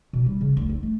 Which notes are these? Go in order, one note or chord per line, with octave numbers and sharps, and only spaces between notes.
B2
G3
C#3
D2
C4
A3